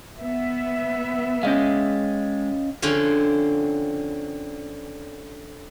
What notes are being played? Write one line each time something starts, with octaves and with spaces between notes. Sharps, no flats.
B3 E5
G#3 C#4 D#5 F5
D3 F3 C4 C#4